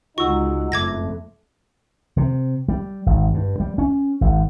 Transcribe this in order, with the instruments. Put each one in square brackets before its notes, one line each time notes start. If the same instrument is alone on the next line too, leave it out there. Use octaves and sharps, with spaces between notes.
[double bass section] C#2 D3 G#3 [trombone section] D#4 F#4 [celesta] F4 E6 [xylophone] C#6
[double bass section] F#1 F2 G#2 [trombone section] A3 [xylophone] D6 G#6 A#6
[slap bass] C3
G3
G#1
G2
G3
C#4
G#1